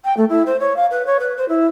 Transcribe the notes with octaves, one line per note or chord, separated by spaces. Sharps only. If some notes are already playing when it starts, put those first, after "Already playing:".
G5
A3
E4
C5
C#5
F5
B4
C#5
B4
C5
E4